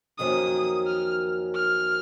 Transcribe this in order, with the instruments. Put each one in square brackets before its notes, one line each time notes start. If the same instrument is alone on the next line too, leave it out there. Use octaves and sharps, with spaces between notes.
[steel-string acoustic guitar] F2 D#3 F#3 A#3 C#4 [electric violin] D#6
[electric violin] F6
F6